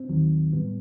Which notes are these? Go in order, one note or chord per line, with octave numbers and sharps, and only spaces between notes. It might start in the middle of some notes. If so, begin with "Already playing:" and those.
Already playing: C4
D#2 D#3 F#3
A2 G3 B3